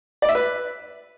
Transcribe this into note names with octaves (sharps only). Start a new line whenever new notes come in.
D5
E5
B4